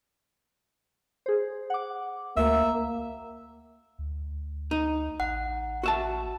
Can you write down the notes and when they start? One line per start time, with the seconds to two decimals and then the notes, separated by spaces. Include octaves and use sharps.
1.26 G#4 C5
1.70 F#5 D6
2.37 D2 A#3 E5
3.99 D2
4.71 D#4
5.20 A1 F#5
5.83 F#4 E5 A5